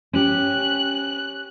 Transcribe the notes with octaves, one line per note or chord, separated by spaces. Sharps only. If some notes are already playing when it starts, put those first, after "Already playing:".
C#4 G4 F#6